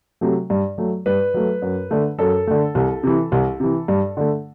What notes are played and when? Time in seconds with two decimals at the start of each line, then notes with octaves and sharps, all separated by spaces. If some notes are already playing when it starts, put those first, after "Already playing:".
0.21 C3 F#3 A3
0.50 G2
0.78 F#3 A3
1.06 G2 B4
1.34 F#3 A3
1.62 F#2
1.91 D3 A3
2.19 F#2 A4
2.47 D3 A3
2.75 C2
3.03 C3 E3
3.32 C2
3.60 C3 E3
3.88 G2
4.17 D3 A3